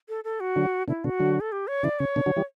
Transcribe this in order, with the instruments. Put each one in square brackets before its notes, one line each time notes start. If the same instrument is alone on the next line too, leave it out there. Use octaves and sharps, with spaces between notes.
[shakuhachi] A4
A4
F#4
[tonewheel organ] D3 F#3
[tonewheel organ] B2 D3 [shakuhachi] E4
[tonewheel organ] B2 D3 [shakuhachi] F#4
[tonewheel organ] D3 F#3
[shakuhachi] A4
G4
C#5
[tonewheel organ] C#3 E3 [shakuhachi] D5
[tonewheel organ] C#3 [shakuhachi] C#5
[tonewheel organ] B2 D3
D3 F#3
E3 G3